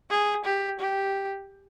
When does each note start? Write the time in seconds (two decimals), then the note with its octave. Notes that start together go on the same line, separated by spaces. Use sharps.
0.10 G#4
0.45 G4
0.79 G4